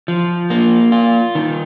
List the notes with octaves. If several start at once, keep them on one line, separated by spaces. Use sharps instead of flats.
F3
A#3
F4
D#3